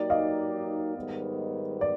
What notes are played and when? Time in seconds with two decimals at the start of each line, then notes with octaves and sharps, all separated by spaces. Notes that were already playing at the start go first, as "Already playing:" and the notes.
Already playing: F#3 A#3 D#4 G4 D5
0.10 D#5 F5
0.95 G#2 D#3 G3 B3
1.81 D5